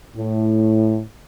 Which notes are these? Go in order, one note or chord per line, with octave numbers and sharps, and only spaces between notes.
A2